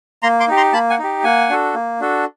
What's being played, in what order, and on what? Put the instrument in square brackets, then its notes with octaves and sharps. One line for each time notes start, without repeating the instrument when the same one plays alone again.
[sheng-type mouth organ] A#3 A#5 C6
C6 D6
D#4 G4
A#5 C6
A#3 A5 B5
F#5 G#5
D#4 G4
A#3 F#5 G#5
D4 F#4 A4
A#3
D4 F#4 A4